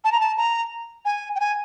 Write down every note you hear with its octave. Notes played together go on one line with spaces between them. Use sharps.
A5
A#5
A5
A#5
G#5
G5
G#5